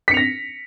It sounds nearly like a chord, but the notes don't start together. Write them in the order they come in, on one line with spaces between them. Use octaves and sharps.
B6 C#7 F7 A#6